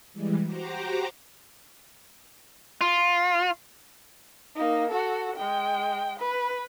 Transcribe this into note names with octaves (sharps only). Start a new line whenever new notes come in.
E3 G3 G#3
F#4 G4 C5 A#5 D6
F4
A#3 D#4
F#4 A4
G#3 G5
B4